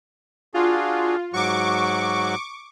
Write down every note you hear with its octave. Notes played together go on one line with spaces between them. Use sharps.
D4 F4 F#4 G#4
G#2 F#3 F#4 C#6 D6